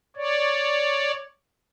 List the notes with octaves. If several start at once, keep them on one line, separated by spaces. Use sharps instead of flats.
C#5 D5